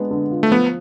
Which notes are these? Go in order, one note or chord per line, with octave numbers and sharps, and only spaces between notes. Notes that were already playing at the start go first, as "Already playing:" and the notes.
Already playing: G#3 B3 D4
D3
F4
A3
F3 B3